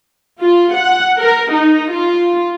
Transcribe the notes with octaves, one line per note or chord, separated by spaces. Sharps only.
F4
F#5
A#4
D#4
F4